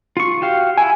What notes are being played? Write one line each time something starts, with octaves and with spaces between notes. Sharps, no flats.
F4 C#6
F#4 G4 F5
E4 G#5